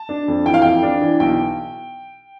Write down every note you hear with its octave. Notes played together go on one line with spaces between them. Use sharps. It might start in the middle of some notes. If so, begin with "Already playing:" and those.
Already playing: A5
D4
F2
E3 G5
F5
F2 G5
D4
E3
B1 G5